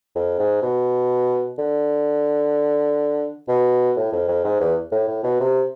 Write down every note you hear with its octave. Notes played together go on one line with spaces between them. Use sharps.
F2
G#2
B2
D3
B2
A2
F2
F2
G#2
E2
A2
A2
B2
C3